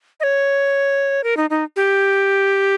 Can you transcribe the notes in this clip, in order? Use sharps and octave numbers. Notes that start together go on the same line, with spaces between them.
D#5
C#5
A#4
D#4
D#4
G4